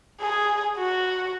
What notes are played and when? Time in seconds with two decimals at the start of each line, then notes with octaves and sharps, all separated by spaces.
0.21 G#4
0.79 F#4